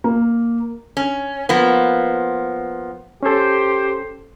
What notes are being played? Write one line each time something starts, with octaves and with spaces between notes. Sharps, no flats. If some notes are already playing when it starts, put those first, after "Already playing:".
A#3
C#4
F3 A#3 B3
C#4 G4 A4 C5